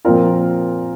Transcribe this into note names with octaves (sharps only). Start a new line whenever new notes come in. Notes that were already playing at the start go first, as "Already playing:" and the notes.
A#2 F3 C4 F4 A#4